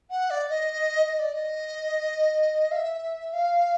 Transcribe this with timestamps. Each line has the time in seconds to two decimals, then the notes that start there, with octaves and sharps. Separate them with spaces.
0.11 F#5
0.30 D5
0.49 D#5
1.06 D#5
1.19 D5
1.33 D#5
2.71 F5
2.76 E5
3.33 F5